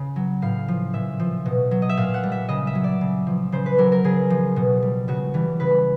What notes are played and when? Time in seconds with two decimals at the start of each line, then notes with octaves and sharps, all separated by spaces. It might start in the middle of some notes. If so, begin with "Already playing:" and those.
Already playing: C#3
0.16 F#3
0.42 A2 F5
0.68 F3
0.94 A#2 E5
1.19 F3
1.46 B2
1.71 F#3
1.82 D#5
1.89 E5
1.97 A#2 F5
2.14 F#5
2.23 G3
2.32 E5
2.49 C#3 D#5
2.67 E5
2.75 F#3
2.84 D5
3.01 C#3
3.27 F3
3.52 C#3 C5
3.66 B4
3.78 F#3 A#4
3.92 A#4
4.04 C#3 G#4
4.30 F3
4.56 B2
4.83 G3
5.08 C#3 F#4
5.34 E3 G3
5.60 C#3 B4